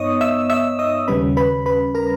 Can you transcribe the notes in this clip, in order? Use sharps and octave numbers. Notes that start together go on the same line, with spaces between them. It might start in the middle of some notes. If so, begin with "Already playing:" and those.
Already playing: G2 B3 D#4 C#5 D#5 C#6 D#6
E5 E6
E5 E6
D#5 D#6
D#2 C#3 G3 C#4 B4 B5
B4 B5
B4 B5
A#4 A#5